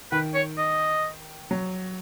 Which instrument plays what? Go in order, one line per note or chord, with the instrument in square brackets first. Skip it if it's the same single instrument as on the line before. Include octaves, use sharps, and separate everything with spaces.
[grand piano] D#3 [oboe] B4
[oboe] C#5
D#5
[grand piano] F#3